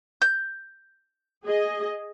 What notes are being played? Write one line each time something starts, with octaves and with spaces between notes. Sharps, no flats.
G6
G#4 D#5